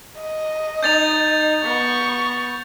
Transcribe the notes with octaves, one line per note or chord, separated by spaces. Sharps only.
D#5
D#4 G6 A6 F7
B3 C#6